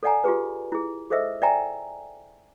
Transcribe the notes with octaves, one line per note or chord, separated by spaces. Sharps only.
A4 C#5 D5 F#5 G#5 A#5
F4 G4 G#4 B4
E4 G#4
G#4 A4 C5 D#5 E5 E6
D5 E5 G5 G#5 A#5